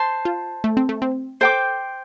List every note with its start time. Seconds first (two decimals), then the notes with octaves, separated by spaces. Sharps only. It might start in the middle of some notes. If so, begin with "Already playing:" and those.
Already playing: C5 A5 C6
0.25 F4
0.64 A3
0.77 C4
0.89 A3
1.02 C4
1.41 A4 C5 G5 D6